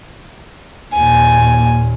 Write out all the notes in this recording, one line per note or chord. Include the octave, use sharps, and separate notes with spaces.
D#2 A#2 G#5